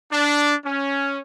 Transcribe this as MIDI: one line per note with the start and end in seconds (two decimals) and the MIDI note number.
0.12 0.54 62
0.65 1.19 61